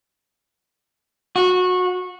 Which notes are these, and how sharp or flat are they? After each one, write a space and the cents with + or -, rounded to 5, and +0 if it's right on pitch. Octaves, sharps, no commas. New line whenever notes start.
F#4 -20